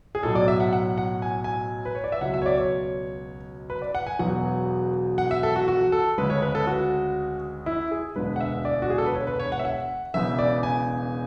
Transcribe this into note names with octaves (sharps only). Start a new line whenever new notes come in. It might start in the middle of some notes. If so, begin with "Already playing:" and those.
G#4
B1 A2 F#3 A4
D5
E5
F#5
F#5
F#5
G#5
G#5
B4
C#5
D5
E5
C#2 B2 F#3 F#5
E5
C#5
D5
C#5
B4
D5
F#5
G#5
E1 E2 B2 F#3 F#5
F#5
E5
A4
F#4
F#4
A4
D2 C#3 G#3 B4
C#5
B4
A4
F#4
E4
G#4
E1 D2 D3 G#3 B4
F#5
E5
D5
F#4
G#4
A4
B4
C#5
B4
C#5
F#5
E5
F#5
E1 E2 C#3 E3 E5
D5
G#5